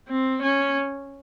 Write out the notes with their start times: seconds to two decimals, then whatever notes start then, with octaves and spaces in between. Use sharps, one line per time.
0.08 C4
0.42 C#4